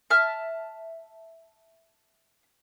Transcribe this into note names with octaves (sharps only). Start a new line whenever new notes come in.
E5 A5 F6